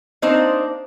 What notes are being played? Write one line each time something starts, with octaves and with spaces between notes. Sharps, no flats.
A#3 C4 D4 D#4 C5